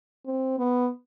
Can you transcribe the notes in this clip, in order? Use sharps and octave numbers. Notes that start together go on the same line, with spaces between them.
C4
B3